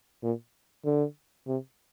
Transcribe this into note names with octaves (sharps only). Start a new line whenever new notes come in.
A#2
D3
C3